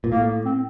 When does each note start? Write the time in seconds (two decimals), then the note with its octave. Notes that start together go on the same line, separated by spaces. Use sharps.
0.04 A#2
0.12 A2 A#3
0.45 C4